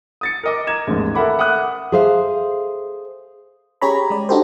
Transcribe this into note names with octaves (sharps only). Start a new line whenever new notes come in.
D#6 A6 C#7
A#4 D#5 D6
A#5 G#6 E7
A1 D#2 G#2
A4 A#4 E5 F#5 B5 D6
E5 F#5 D6 D#6 F#6
G#4 A4 C5 E5 F5
C#4 G4 G#4 C#5 A#5 B5
G#3 D5
D4 D#4 F#4 G4 A4 C5